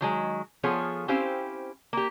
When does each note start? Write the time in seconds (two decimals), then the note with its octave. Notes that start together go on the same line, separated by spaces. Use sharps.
0.01 D#3 F#3 G#3
0.63 F3 B3 F4 G#4 A4 C#5
1.08 C4 C#4 E4 G4 C5 F5
1.93 A#3 G4